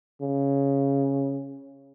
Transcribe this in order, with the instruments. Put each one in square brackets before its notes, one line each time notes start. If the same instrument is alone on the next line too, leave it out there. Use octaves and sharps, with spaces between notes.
[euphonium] C#3